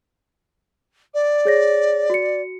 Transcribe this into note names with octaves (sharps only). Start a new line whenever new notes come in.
D5
G#4 C#5 A#6
F#4 C#7